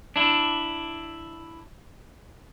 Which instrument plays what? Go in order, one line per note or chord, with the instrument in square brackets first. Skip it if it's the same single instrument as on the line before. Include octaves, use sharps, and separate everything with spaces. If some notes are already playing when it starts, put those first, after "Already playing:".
[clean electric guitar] D4 E4